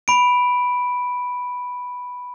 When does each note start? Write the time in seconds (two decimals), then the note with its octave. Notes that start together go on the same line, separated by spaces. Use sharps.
0.08 B5 D7